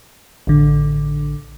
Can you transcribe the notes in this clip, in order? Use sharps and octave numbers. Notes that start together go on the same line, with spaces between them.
A1 D3